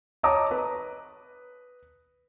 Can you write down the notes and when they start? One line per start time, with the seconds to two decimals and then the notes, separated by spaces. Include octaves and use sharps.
0.23 C#5 D#5 A5 A#5 D6 D#6
0.51 B4